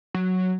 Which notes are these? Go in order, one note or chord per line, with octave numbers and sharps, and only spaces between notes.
F#3